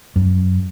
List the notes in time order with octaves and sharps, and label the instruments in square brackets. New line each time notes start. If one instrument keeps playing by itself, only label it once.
[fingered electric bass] F#2